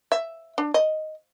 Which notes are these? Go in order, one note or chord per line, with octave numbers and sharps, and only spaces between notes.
E5
D4
D#5